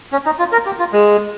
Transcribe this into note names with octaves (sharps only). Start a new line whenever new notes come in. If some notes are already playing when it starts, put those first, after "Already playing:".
C#4
D#4
F4
A#4
G4
F4
G#3